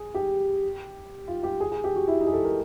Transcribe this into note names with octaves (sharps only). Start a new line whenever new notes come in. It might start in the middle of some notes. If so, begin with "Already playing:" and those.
Already playing: G#4
G4
F4
G4
G#4
G#4
G4
F#4
E4
D#4
G#4
A4
A#4